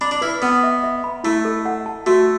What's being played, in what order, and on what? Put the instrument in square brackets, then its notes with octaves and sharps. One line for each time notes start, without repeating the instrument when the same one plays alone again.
[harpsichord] D4 [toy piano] B5
[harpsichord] D4
[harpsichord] E4 [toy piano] B4
[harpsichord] B3 [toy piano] B4
[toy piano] E5
E5
B5
[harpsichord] A3 [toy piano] E4
[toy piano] A4
F#5
A5
[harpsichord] A3 [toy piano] F#4